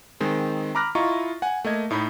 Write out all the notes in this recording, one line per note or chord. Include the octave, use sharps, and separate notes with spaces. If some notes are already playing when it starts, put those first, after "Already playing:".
D#3 G#3 C4
A#5 B5 D6 F6 F#6 A#6
E4 F4 D#5 A#5 C#6
F#5 G#5
A3 A#3 D#5 G#6
A2 D#4 D#5 B5